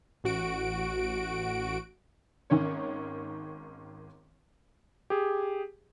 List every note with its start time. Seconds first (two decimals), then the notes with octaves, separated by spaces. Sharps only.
0.24 A1 F#4 D7
2.50 G#1 D#3 C#4 C#5
5.10 G4 G#4